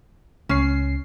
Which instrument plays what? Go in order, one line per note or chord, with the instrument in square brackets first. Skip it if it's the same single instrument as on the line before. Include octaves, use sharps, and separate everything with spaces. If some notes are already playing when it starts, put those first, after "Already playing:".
[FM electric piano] C#2 C7 [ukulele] C#4